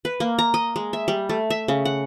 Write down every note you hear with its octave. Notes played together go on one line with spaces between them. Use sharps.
B4
A#3
A#5
D#5
G#3
E5
G3
A3
E5
C#3
F#5